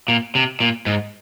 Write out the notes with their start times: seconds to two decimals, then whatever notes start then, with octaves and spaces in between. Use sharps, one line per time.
0.08 A#2
0.35 C3
0.60 A#2
0.86 G#2